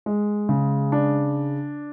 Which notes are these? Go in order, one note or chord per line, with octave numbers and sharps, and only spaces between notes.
G#3
C#3
D4